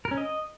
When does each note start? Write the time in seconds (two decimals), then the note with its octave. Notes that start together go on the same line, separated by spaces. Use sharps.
0.05 A#4
0.11 C#4
0.17 D#5